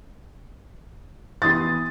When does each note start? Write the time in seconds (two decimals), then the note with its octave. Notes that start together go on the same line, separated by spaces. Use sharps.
1.42 E3 B3 G4 C6 D#6 A6